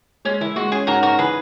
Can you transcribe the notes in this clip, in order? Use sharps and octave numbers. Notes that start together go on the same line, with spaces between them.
G#3 C#4
E3 E4
G#3 F#4
C#4 G#4
G#2 F#4 A#4
G#2 F#4 A#4
E3 G#4 B4